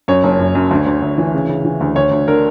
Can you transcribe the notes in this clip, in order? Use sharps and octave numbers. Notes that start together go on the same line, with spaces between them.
F#2 C#5
F#1
F#2
F#2
D2
D2
D2
E3
C#3
C#3
E3
D2
D2 C#5
D2
D3 A#4